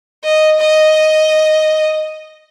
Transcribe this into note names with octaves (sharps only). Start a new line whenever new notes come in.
D#5
D#5